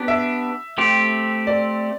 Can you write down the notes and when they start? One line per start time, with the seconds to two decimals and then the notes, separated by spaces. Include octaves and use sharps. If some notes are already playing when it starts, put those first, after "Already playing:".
Already playing: B3 D4 G4
0.08 E5
0.78 A3 C4 G4
1.47 D5